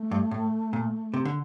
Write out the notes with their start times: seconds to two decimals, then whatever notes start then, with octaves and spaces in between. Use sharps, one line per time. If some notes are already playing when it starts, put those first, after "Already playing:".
Already playing: A3
0.11 G2
0.31 A2
0.73 A#2
1.14 C3
1.25 D3